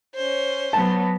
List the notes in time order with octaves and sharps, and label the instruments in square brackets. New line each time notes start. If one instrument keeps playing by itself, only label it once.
[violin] C#4 C5
[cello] F#3 B3 [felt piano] A5